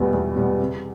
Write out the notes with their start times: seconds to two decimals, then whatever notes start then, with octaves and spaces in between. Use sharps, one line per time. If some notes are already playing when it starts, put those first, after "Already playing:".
Already playing: E2 B2 G3 B3
0.13 E2
0.36 B2 G3 B3
0.59 C3